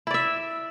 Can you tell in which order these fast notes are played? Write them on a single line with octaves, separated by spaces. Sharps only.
E4 D5 E5